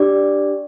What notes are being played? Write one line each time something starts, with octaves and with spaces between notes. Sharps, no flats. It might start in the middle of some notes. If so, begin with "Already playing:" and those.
Already playing: D4 G4 D5